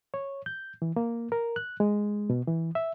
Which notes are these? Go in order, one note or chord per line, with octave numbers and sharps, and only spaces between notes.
C#5
G6
E3
A#3
A#4
F#6
G#3
B2
E3
E5